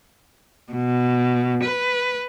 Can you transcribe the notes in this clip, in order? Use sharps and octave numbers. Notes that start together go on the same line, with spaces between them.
B2
B4